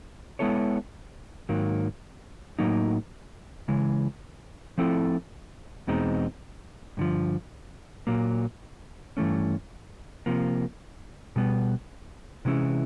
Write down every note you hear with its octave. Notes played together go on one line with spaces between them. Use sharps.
G#3 B3 E4 A4 C#5
G#2 D#3 F#3 A#3
A2 F#3 A#3 D#4
C#3 E3 G#3
F3 A3 C4 E4 A4
E2 B2 G#3 C4 D#4
G2 D3 F3
A#2 F#3 A#3
G2 E3 A3 C#4
C3 F3 A#3
B2 G3 B3
C3 E3 G#3 C#4 E4